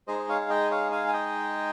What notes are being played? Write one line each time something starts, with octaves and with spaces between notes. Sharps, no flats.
G#3 D#4 G#4 C5 D#5
D#5
C#5 F5
F5
D#5 G5
C#5 F5
F5 G#5
G#5
D#5 G5